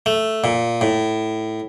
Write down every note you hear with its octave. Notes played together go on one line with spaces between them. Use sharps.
A3
A#2
A2